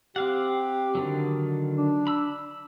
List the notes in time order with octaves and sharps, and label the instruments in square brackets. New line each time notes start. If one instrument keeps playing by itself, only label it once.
[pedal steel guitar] C4 F5 F#5 [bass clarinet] G4
[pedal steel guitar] D3 D#3 F#3
[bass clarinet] D4
[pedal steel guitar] B5 E6